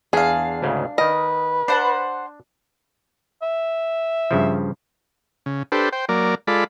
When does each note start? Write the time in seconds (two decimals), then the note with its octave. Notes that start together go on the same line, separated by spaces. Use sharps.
0.13 E2 D4 G#4 F5
0.62 D2 G#2 C#3
0.98 D#3 A#4 B4 D#5
1.68 D4 C5 F#5 A5
3.42 E5
4.31 G2 C#3 F3
5.46 C#3
5.72 D4 G4 A4 B4 C5
5.92 C5 G5
6.09 F#3 A#3 A#4 D5
6.47 G#3 F4 A4 D5 B5